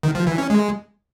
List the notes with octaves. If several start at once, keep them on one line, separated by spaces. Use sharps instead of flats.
D#3
F3
E3
C#4
G#3